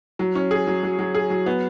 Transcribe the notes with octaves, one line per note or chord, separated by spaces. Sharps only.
F#3
C#4
G#4
F#3
F#3
F#3
G#4
F#3
B3